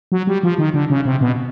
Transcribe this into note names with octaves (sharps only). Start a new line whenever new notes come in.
F#3
G3
F3
D#3
D3
C#3
C3
B2